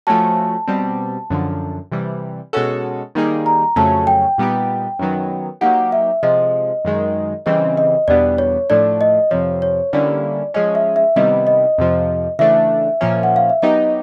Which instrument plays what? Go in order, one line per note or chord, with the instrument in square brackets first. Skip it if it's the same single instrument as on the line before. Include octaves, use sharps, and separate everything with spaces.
[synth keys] F3 A3 C#4 F#4 [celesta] A5
[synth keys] B2 G3 C4
F#2 D3 F3
C3 E3 G3
B2 G#3 C#4 F#4 A4
D#3 G3 A#3 D#4 G#4
[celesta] A#5
[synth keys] F2 C#3 F#3 A3 C#4 [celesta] A5
[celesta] G5
[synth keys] A#2 G3 B3 D#4 G4
F#2 D#3 F#3 B3
[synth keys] F#3 A#3 D#4 G4 [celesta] F#5
[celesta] E5
[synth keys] C3 F3 G#3 [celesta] D#5
[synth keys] F#2 D#3 G#3
[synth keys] C#3 E3 G3 C4 [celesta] D#5
[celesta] D#5
[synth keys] E2 B2 G3 B3 D4 [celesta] D5
[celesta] C#5
[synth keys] A2 F3 A3 D4 [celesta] D5
[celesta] D#5
[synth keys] F2 C3 F3 [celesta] C#5
[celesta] C#5
[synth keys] D3 G3 A#3 C#4 E4 [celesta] D5
[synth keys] F3 G#3 C#4 [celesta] D#5
[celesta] E5
E5
[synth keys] C3 D#3 G3 B3 E4 [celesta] D#5
[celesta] D#5
[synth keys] F2 C3 F3
[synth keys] C#3 E3 A3 D4 [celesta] E5
[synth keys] A#2 F3 A#3 C#4
[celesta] F#5
F5
E5
[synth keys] F#3 B3 D#4 G4 [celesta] D#5